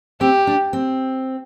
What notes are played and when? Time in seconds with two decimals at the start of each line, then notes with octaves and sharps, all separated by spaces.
0.21 C4 G4
0.47 D4
0.73 C4